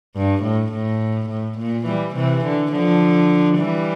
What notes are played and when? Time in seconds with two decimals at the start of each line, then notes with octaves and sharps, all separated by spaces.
0.16 G2
0.43 A2
0.73 A2
1.30 A2
1.58 A#2
1.86 E3 G3
2.16 C3 E3
2.44 D3
2.72 D3 F3
3.57 E3 G3